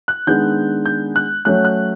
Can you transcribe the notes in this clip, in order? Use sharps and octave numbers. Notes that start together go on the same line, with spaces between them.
F#6
D#3 G#3 B3 D4 G6
G6
F#6
F#3 A3 C#4 F#6
F#6